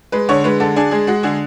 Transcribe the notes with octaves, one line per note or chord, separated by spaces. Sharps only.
G#3 B4
D3 C#5
G#3 B4
D3 A4
D4 G#4
G#3 G#4
G#3 F#4
D3 G#4